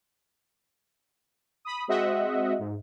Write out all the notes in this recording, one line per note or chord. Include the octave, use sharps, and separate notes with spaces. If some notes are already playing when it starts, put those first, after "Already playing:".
B5 D#6
G#3 C4 F#4 D#5 E5 F#5
G#2